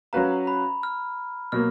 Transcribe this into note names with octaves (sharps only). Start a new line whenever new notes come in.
F#3 C#4 F#4 B4 F5 A#5
B5
F6
B2 F#3 A#3 F6